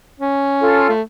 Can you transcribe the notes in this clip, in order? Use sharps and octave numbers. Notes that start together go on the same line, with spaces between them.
C#4
F4 A4
A3